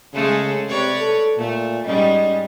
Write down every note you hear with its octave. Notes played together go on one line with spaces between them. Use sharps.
C#3 G#3 A3 A4
C3 B4 C#5 D5
A4
A#2 A3
G#2 G3 C#4 D#5